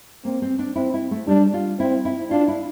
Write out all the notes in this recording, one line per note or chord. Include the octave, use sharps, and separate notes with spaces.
A#3 C4
C4
D4
C4 E4
E4
A3
G3 D4
F4
C4 E4
E4
D4 F4
E4